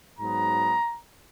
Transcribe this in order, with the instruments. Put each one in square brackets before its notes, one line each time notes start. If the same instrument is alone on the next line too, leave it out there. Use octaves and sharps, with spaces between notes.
[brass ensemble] G#2 F#3 B3 A#5